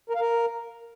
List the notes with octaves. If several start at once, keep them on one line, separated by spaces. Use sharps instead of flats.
A#4
F5
A#4